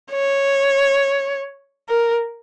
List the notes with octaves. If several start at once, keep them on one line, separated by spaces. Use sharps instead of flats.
C#5
A#4